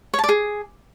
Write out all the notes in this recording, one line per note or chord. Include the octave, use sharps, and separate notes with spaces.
C#5
A5
D5
G#4